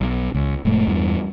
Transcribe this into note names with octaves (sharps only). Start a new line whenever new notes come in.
B1
C#2
F1 A2 G#3 A3
E2 G2 E3